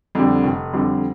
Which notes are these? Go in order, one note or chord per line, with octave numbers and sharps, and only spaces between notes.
F2 D3 G3
F1
F2 D3 G3